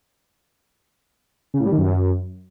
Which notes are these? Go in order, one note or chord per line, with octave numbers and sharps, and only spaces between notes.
C#3
A2
G3
D#3
F#2